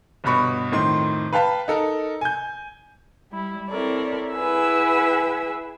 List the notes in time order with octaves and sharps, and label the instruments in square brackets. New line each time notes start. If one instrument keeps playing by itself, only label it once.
[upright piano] G1 G2 B2 B5 C#6
F2 A2 D#3 C6
B4 F5 G5 A5 B5
D#4 A4 A#4
G#5 G6
[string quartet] G3 E4
C4 E4 A4 A#4 C#5 D5
E4 G#4 B4 F#5 G#5 E6